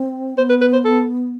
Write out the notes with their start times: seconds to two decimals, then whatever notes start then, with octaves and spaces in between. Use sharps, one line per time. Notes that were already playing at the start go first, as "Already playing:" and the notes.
Already playing: C4
0.37 B3 C5
0.50 B4
0.61 B4
0.73 C5
0.85 A4